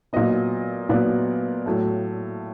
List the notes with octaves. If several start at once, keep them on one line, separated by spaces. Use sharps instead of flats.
A#2 F#3 B3 D#5
A#2 F#3 B3 D5
A2 F#3 A3